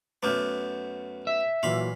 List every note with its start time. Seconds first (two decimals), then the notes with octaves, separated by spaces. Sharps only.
0.23 F#2 A3 B3 D6 F6 G6
1.27 E5
1.63 A#2 E3 F#3 F5 B5